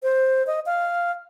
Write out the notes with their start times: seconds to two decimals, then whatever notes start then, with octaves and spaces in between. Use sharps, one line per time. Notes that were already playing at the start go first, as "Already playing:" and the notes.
0.03 C5
0.47 D#5
0.66 F5